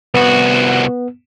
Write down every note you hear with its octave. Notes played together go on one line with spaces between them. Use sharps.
C2 B3 F#4